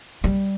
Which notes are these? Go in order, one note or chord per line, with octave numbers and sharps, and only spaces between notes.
G3